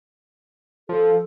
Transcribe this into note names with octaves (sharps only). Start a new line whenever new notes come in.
F3 A4